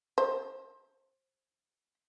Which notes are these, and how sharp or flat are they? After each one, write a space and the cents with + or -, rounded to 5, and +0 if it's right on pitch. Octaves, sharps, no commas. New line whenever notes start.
C5 +25